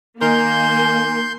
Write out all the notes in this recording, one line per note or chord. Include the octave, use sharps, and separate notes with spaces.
D#3 A#3 A#4 G#5 C6 G6